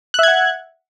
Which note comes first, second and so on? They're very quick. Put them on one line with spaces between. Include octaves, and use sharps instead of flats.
F#6 E5 G#6 F#5